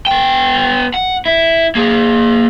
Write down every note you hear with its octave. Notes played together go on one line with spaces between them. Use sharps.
B3 G5
F#5
E4
A#3 G#4